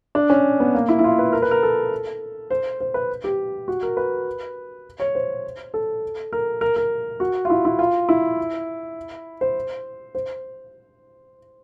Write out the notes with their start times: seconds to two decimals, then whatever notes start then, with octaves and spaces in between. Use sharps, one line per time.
0.15 D4
0.30 C#4
0.60 B3
0.75 A#3
0.89 E4
0.99 E4
1.04 F4
1.19 B4
1.33 A#4
1.42 B4
1.51 A#4
1.63 A4
2.51 C5
2.81 C5
2.94 B4
3.24 G4
3.68 F#4
3.83 A#4
3.97 B4
5.00 C#5
5.15 C5
5.74 A4
6.33 A#4
6.61 A#4
6.76 A#4
7.20 F#4
7.45 F4
7.50 E4
7.65 E4
7.79 F4
8.09 E4
9.41 C5
10.15 C5